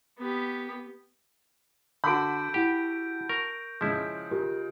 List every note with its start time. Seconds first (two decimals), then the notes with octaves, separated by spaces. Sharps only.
0.19 B3 G4
2.04 D3 F#4 A4 B5 G6 D7
2.54 E4 G4 F#5 G5
3.30 A#4 C#6
3.81 C#3 F3 G#3 E4
4.31 F4 G4 A#4